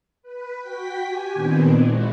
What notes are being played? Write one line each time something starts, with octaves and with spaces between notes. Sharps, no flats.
B4
F#4 G5 B6
G4 G#5
A#2 D#3 B3 C4 D4
G#3 E4 F#4